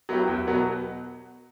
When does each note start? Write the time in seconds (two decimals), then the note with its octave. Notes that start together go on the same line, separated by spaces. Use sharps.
0.09 F#3 B3 E4 G4
0.28 E2
0.47 B2 F#3 B3